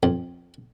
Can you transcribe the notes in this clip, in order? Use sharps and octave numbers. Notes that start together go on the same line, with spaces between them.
F2